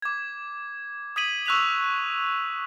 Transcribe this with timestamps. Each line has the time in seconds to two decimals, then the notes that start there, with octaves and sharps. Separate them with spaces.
0.02 D6 G#6
1.16 D#6 G#6 B6 D#7 F#7
1.46 C#6 E6 F#6 B6 F7 F#7